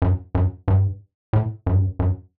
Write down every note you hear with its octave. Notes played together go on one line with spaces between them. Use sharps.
F#2
F#2
G2
A2
F#2
G2
F#2
F#2